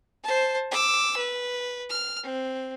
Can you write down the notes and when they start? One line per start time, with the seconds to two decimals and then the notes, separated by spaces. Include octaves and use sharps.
0.23 C5 A5
0.71 D6 E6
1.17 B4
1.90 F6
2.23 C4